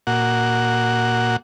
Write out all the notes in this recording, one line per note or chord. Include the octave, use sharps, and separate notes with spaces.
A#2 F#4